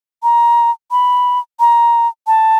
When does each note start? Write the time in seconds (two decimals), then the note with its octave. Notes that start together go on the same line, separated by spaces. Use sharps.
0.23 A#5
0.91 B5
1.60 A#5
2.27 A5